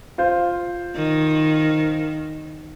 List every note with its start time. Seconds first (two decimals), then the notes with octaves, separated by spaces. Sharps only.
0.18 F4 C5 F5
0.96 D#3